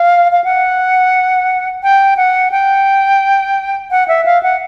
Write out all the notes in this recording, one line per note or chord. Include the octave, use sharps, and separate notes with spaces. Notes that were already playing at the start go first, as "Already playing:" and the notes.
Already playing: F5
F5
F#5
G5
F#5
G5
F#5
E5
F5
F#5